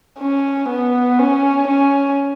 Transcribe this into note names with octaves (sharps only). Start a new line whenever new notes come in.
C#4
B3
C#4
C#4